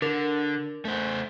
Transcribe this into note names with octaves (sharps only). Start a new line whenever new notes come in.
D3 D4 A#4
A3 C5